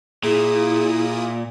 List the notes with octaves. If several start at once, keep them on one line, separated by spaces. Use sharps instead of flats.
A#2 E4 G#4 D#6